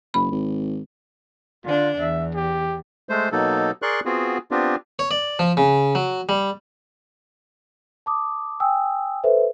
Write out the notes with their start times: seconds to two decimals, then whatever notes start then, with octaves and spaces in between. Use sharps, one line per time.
0.14 F#1 B5
0.31 G#1
1.65 D3 D4 F4
2.00 E2 E5
2.35 G4
3.09 G#3 A3 C5
3.32 B2 F#3 A#3 D#4 A4
3.82 G#4 A#4 D5 C6 C#6 F#6
4.05 B3 C4 F4 F#4 G#4
4.51 B3 C4 D4 F4 G4
4.99 C#5
5.11 D5
5.39 F3
5.57 C#3
5.95 F#3
6.29 G3
8.06 A5 D6 D#6
8.60 G5 G#5 D#6 E6
9.24 A4 B4 C5 E5